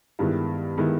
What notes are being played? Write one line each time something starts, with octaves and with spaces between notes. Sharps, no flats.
G2 D#3 G#3 B3 E4
D#3 G#3 B3 E4